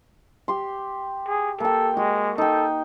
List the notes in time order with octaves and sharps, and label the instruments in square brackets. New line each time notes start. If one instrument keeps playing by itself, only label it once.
[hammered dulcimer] G4 C6
[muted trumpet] G#4
[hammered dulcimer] A#3 G5 [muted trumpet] A4
[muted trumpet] G#3 [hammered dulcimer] F#4
[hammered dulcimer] D#4 G5 [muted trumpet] A4